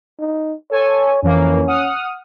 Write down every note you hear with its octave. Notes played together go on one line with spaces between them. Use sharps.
D#4
A4 C#5 G#5
F2 E3 A#3 C#4
F#5 D#6 F6